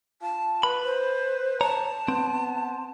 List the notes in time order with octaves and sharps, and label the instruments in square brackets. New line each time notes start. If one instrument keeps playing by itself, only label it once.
[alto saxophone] F4 [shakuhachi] A5
[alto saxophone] B4 [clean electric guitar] B5
[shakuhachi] C5
[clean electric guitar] C#5 A#5 [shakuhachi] A5
[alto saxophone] B3 [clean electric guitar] C4